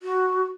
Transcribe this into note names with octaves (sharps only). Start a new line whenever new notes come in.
F#4